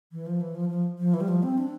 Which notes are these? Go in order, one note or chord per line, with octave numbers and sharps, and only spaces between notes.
E3
F3
E3
F3
F3
F3
E3
G3
F3
C4
D4